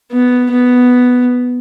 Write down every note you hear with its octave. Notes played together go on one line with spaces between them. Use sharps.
B3
B3